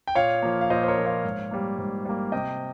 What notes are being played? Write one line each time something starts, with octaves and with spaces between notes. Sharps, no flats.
G5
A#2 C#5 F5
F3 A#3
F5
A#2 C5 D#5
C5
A#4 C#5
F3 A#3
C#5 F5
G#2
G3 A#3
G#2
G3 A#3
C3 D#5 G5